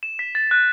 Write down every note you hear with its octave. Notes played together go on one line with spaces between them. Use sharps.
E7
B6
A6
F#6